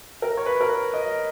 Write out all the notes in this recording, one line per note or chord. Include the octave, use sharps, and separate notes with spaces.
A#4
C#5
B4
A#4
B4
D#5